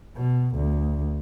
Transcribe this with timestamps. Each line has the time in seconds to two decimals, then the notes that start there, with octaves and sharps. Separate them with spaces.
0.17 B2
0.56 D2